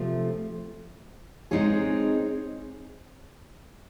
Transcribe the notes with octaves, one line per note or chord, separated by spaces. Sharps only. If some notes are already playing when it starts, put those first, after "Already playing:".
Already playing: C3 F3 A3
G#3 C4 D#4 G#4 C#5